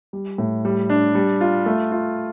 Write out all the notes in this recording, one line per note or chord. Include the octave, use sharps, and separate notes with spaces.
G3
A2
G3
D4
G3
F4
A3
F4